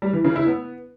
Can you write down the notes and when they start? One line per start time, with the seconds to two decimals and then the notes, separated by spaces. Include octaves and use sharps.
0.02 G3
0.13 E3
0.24 C#3
0.36 E4
0.47 B3